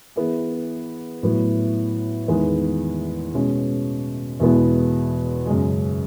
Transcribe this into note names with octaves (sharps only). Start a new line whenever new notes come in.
E3 B3 E4 G#4
A2 F#3 B3
E2 D#3 G#3 B3 E4
B2 G#3 C#4
E2 B2 G#3 B3 E4
F#2 C#3 G#3